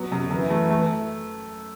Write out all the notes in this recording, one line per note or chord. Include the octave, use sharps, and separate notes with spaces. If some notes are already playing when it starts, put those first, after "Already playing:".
Already playing: F#3 B3
F#2 C3
D3
F#2 E3
A3
A3